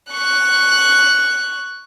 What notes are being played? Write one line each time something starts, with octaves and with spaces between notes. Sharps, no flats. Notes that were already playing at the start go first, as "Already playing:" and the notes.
C#6 F#6